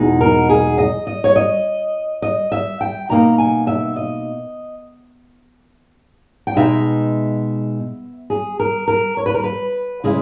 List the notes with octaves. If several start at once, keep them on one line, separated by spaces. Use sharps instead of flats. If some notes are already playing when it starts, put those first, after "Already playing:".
Already playing: E2 B2 G#3 D#4
A#4
G#4
D#5
D#5
C#5
D#5
D#5
E5
G5
B2 A#3 D#4 A#5
G#5
E5
D#5
G5
B2 G#3 D#4 E5
G#4
A#4
A#4
C#5
B4
A#4
B4
C#3 G#3 C#4 E4